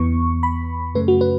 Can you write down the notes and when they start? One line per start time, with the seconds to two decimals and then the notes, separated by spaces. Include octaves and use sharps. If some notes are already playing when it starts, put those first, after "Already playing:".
Already playing: E2 E3 B3 C#6
0.43 B5
0.95 F#2 C#3 A3 B4
1.08 F#4
1.21 B4